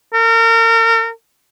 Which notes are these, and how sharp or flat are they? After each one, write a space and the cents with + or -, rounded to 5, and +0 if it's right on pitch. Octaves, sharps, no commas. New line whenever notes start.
A#4 -35